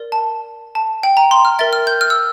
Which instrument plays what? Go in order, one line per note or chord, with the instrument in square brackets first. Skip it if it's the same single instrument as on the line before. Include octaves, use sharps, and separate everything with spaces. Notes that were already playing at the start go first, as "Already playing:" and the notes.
Already playing: [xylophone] A#4 D5
A5
A5
G5
A#5
C6
F6
A#4 E5 G5 A6
F6
G6
F6
E6